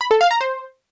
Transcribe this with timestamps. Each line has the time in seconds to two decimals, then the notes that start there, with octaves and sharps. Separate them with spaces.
0.01 B5
0.11 A4
0.21 F5
0.31 A#5
0.41 C5